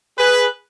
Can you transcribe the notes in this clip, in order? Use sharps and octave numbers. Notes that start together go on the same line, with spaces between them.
G#4 B4